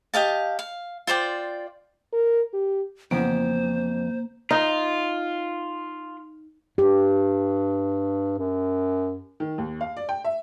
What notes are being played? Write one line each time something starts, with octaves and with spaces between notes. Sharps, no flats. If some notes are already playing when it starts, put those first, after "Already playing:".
G4 D#5 F5 A5
F5
F4 C5 D5 G5
A#4
G4
F2 C#3 E3 A#3 B3 C5
D#4 F4
G2 G4
F#2
D#3
D#2
F5
D5
G5
E5